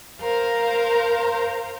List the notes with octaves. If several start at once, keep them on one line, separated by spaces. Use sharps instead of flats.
A#4 C5 F5 A#5